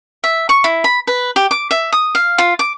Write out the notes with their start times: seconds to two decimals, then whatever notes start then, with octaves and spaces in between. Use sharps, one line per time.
0.24 E5
0.49 C#6
0.64 E4
0.84 B5
1.07 B4
1.36 G4
1.51 D6
1.71 E5
1.92 D#6
2.15 F5
2.38 F4
2.59 D6